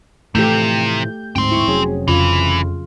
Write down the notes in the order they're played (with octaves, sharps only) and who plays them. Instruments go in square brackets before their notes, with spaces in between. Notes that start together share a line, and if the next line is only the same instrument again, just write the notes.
[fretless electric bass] A2 E3 F3 [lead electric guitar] C3 [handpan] A3 G4 [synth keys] G6
[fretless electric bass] D1 G#2 [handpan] C4 [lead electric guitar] G5 C6
[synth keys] E4 C#6
[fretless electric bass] F1 C#4 [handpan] F#3 [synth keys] G#4
[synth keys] F2 [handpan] C#3 F4 [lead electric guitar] E3